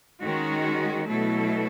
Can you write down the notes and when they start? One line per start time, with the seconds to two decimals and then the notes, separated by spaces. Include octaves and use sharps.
0.23 D#3 G#3 C#4 F#4
1.06 B2 F#3 A3 E4 A4